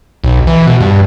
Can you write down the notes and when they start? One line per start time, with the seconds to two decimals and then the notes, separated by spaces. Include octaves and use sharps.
0.24 B1
0.47 E3
0.67 B2
0.81 G2